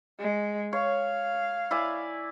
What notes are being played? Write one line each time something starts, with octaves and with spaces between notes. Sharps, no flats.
G#3
C#5 F5
E4 D5 G#5